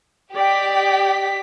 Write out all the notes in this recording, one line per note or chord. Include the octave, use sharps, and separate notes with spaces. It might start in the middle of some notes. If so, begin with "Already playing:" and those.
G4 D5 D#5 G5 B6